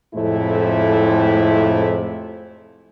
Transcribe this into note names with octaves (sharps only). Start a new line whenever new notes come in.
F2 A2 C3 G#3 A3 E4